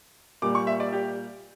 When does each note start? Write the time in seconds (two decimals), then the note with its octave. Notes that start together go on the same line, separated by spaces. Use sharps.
0.42 A#2 G3 D6
0.55 C#6
0.67 E5
0.80 D5
0.93 G4